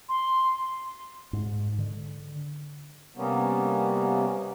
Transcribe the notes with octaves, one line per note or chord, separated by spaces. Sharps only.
C6
G#2
D3
C3 G3 A#3 B3 C#4